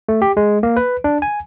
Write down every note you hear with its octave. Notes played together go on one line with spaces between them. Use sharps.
A3
G4
G#3
A#3
B4
D4
G#5